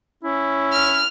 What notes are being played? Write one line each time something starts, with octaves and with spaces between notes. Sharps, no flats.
C#4 E4
F6